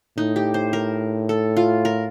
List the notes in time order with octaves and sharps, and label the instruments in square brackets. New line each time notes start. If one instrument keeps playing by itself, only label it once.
[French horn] A2 [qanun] D#4
[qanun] G4
C5
A#4
A4
F4
A#4